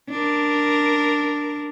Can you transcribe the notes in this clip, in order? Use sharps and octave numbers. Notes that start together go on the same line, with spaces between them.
D4 A#4